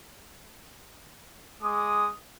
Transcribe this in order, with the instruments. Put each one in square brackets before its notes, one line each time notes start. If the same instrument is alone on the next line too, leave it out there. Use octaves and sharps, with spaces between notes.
[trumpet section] G#3 D6 D#6